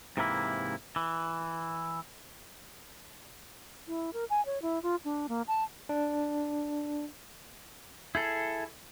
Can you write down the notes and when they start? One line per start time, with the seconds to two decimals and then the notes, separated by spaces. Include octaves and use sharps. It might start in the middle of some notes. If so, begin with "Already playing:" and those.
0.17 G#2 C3 E3 A#3 E4
0.96 E3
3.88 E4
4.13 A#4
4.30 G#5
4.46 C#5
4.62 E4
4.83 F4
5.05 D4
5.29 A#3
5.48 A5
5.89 D4
8.15 E4 G#4 A4